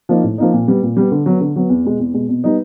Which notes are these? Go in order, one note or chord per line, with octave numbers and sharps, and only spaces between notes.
F3 A#3 D#4
A2
F3 A#3 D#4
A#2
G3 B3
A#2
G3 B3
D3
F#3 B3
D3
F#3 B3
E2
B2 G#3
E2
B2 G#3
B2
G3 B3 D#4